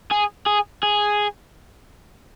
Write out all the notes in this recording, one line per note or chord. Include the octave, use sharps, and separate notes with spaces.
G#4
G#4
G#4